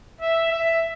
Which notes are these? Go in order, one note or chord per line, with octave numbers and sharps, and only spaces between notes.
E5
E5